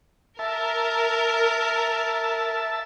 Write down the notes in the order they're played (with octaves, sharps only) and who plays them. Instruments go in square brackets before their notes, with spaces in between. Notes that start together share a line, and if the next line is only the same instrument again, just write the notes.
[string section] A#4 [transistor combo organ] E5 A5